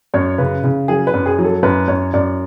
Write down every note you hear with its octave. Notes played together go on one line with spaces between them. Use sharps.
F#2 C#5
C#3 B4
C#3
F#3 G#4
B4
F#2
G#4
F#3
A4
F#2 B4
F#2 C#5
F#2 D5